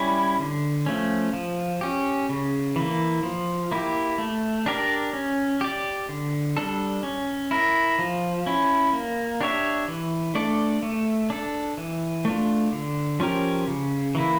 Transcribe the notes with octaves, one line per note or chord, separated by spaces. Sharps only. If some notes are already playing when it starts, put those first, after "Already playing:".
Already playing: G3 C#4 E4
D3
F3 A3 C#4
F3
C#4 G4
C#3
E3 A#3
F3
A#3 E4 G4
A3
D4 G4 A#4 D5
C#4
G4 D5
D3
G3 D4 A4
C#4
E4 A#4
F3
C#4 E4
A#3
D4 G4 C#5 E5
E3
A3 D4 A4 D5
A3
D4 A4
E3
A3 D4 F4
D3
F3 C#4 G4 A#4
C#3
E3 A#3 E4